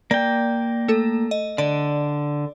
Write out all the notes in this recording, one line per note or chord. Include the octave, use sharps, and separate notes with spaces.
A#3 D5 G5
A3 A4
D#5
D3 D5